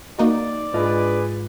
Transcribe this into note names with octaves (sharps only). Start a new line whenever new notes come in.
A#3 D#4 F#4 D5
G#2 D4 F4 G#4 B4 D#5